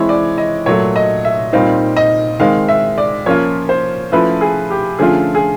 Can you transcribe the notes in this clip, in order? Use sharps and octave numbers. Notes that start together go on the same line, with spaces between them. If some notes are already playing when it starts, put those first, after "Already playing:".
Already playing: E3 G#3 C4 E4 C#5
D5
D#5
A#2 F#3 A3 C#5
D#5
E5
A#2 G3 C4 D#4 F5
D#5
D#3 G#3 C4 F5
E5
D5
F3 A#3 C#4 F4 C#5
C5
F3 A3 C#4 E4 B4
G#4
G4
D3 F3 A3 C#4 F4 G#4
G#4